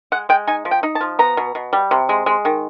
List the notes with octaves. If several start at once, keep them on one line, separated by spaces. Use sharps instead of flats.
G#3 F#5
G#3 G5
D#4 G#5
F3
G5
D#4
A5
F3
B3 A#5
B2
B2
G3
C3
G#3
G#3
D#3